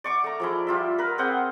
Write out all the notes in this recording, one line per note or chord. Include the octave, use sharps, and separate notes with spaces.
D5 C#6 D6
A3 A#5
F3 G#3 E4
G3 F4 E5
A#4 B4
C4 G#4 F#5 G5